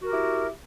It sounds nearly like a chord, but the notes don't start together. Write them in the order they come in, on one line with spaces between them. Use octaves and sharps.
F#4 A#4 G4 E4